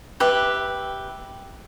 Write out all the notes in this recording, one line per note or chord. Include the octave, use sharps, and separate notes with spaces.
G4 B4 E5